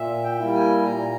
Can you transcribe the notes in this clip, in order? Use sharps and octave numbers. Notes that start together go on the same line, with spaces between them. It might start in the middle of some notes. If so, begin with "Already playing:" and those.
Already playing: A#2 E5
G5
G3 A#3 E4
G#5
A#2 A#5